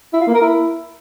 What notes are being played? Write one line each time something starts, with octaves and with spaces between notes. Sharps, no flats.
E4
F4
A#3
A#4
E4